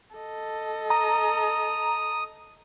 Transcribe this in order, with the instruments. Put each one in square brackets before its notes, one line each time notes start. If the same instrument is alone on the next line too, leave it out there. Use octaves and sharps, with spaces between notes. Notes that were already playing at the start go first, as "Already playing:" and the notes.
[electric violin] A4 D#5
[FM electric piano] A#5 [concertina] D#6